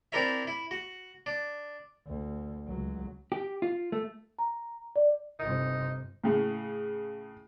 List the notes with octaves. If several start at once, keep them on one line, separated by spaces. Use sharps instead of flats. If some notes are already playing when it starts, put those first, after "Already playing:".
C4 D4 E4 A#4 C#5 E5
E4
F#4
D4
D2
C#2 F#3
G4
F4
A3
A#5
D5
G1 C3 D#4
A2 C#3